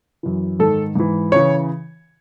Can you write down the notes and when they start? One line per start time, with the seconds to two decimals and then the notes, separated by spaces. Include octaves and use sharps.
0.23 F#2 E3
0.59 G#2 D#3 A4
0.95 G#2 E3
1.32 C#3 E3 C#5